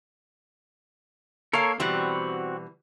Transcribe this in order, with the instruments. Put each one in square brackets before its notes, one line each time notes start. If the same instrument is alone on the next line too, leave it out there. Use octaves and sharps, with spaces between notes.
[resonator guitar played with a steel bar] A#3 F5 [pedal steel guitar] A4 A#4 C#5
[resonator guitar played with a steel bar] B2 E3 G3 [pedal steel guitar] C4 F#4 F#5